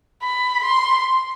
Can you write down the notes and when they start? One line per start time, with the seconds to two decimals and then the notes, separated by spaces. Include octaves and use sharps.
0.23 B5
0.64 C6